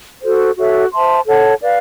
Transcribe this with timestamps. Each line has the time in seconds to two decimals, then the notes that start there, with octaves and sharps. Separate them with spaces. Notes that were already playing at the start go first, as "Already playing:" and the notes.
0.23 F#4 A4 C5
0.57 F#4 A4 C#5 E5
0.92 C5 E5 A5 C6
1.26 A4 C#5 F#5 A5
1.61 B4 D5 F5